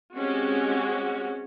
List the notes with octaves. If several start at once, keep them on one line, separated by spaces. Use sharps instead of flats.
G#3 C4 C#4 F#4 G4